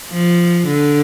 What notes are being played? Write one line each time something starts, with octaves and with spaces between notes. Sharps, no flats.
F3
D3